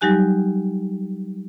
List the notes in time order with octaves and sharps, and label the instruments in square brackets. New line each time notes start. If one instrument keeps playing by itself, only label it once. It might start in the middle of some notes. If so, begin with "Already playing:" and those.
[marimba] F#3 G3 D#4 G4 G#5 F#6